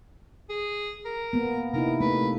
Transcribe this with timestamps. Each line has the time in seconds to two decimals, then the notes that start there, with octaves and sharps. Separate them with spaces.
0.50 G#4
1.05 A#4
1.33 A#3 B3
1.73 C3 D#4 E4 A#4
2.00 A3 A#3 B4